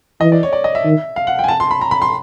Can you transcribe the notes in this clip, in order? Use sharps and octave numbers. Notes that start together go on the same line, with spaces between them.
E3 D#5
D5
C#5
D5
D#5
E5
D#3
F5
F#5
G5
G#5
A5
C6
B5
A#5
B5
C6